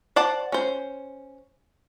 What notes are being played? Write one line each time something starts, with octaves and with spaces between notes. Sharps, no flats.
C5 D5 F#5 A5
C#4 C5